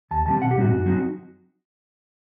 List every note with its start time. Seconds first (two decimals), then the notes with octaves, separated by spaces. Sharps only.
0.11 D#2 A5
0.26 D#3 G3 C4 A5
0.41 B1 F#5
0.51 G4
0.56 A2 G3 C4 D#4 F#4
0.70 F#2 F#4
0.86 F#3 C4 D#4 F#4